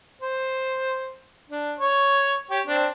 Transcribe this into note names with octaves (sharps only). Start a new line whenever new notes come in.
C5
D4
C#5
G4 C#5
C4 D4